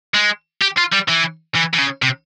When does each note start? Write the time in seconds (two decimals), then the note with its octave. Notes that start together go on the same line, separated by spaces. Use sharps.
0.14 G#3
0.61 G4
0.77 F4
0.92 G3
1.08 E3
1.55 E3
1.74 E3
1.79 C#3
2.02 C3